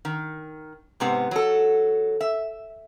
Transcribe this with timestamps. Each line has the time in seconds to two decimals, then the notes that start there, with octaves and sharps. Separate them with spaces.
0.05 D#3
1.00 G#2 C3 B3
1.31 F#3 A4
2.21 E5